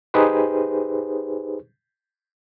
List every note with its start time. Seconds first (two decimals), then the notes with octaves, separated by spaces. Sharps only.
0.14 D#4 G4 G#4 B4 C5